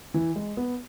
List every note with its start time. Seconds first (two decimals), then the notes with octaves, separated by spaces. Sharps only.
0.14 E3
0.36 G#3
0.57 B3